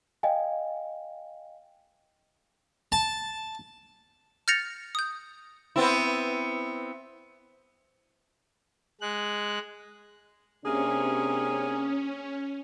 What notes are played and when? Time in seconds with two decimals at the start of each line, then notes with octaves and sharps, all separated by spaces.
0.23 D#5 F5 G5 G#5
2.92 A5
4.48 F6 G6 A6 A#6 C#7 F7
4.95 D#6 G6
5.76 B3 C4 E4
9.01 G#3 F#6
10.65 C3 A#3 C#4 D4 G#4